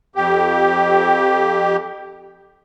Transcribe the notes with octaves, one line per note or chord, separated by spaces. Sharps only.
F2 G4